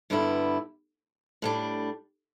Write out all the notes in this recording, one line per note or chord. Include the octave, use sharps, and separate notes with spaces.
G2 D3 G3 B3 E4
A2 G3 D4